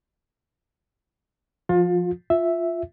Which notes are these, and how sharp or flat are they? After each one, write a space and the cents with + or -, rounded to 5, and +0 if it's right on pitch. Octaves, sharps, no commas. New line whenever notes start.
F3 +0 F4 +30
F4 +0 E5 +0